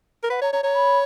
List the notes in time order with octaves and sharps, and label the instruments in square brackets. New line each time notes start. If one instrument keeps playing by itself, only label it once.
[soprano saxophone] A#4
[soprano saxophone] B4 [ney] F#5
[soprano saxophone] C#5 [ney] A#5
[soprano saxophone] C#5 [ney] A#5
[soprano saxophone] C#5 [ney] A#5
[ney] B5